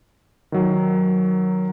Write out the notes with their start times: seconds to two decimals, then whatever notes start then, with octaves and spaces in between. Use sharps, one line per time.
0.52 D#3 F#3